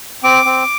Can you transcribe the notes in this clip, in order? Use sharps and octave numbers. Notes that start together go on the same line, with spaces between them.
C4 D6
C4